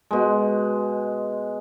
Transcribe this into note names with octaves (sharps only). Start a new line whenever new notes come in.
B2 G#3